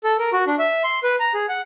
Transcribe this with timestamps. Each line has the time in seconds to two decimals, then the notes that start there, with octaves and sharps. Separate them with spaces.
0.04 A4
0.19 A#4
0.33 F#4
0.47 D4
0.59 E5
0.84 C6
1.03 B4
1.20 A#5
1.34 G#4
1.49 F#5